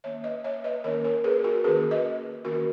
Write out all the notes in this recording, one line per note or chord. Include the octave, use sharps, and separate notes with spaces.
D#3 A#3 C#4 C#5 E5
B4 D#5
C#5 E5
B4 D#5
D#3 A#3 C#4 A#4 C#5
A#4 C#5
G#4 B4
F#4 A#4
D#3 A#3 C#4 G#4 B4
B4 D#5
D#3 A#3 C#4 F#4 A#4